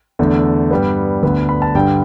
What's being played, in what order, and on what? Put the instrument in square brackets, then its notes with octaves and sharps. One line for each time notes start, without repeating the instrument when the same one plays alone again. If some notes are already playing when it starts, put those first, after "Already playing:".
[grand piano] E2 D3 A3
G2 G3 B3
D2 D3 B3
B5
A5
G2 D3 G3 G5